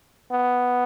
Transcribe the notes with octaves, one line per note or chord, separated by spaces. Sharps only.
B3